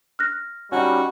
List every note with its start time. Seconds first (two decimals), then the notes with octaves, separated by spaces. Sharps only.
0.19 F6 F#6 A#6
0.72 G3 C#4 D#4 F#4